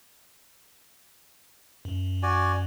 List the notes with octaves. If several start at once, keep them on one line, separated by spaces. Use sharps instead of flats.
F#2
F#4 D5 G#5